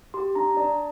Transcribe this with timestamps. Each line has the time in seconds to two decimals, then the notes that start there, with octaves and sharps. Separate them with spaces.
0.14 G4 C6
0.35 D4 A#5
0.57 D4 D5